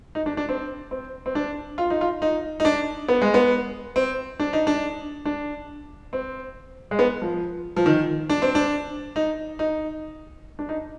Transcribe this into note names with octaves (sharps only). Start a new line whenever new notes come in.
D#4
D4
D4
C4
C4
C4
D4
F4
D#4
F4
D#4
D#4
D4
B3
G#3
B3
C4
D4
D#4
D4
D4
C4
G#3
B3
F3
F3
D#3
D4
C4
D4
D#4
D#4
D4
D#4